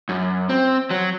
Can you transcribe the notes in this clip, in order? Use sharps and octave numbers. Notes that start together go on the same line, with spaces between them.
F#2
C4
F#3